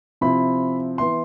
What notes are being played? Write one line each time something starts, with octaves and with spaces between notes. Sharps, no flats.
C3 F3 C4 E4 B5
E3 B3 E4 C6